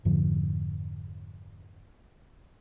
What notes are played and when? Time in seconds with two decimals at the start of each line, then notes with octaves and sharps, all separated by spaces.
0.05 F2 G#2 D3 F3